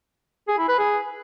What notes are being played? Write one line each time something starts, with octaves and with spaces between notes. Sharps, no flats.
G#4
E4
B4
G#4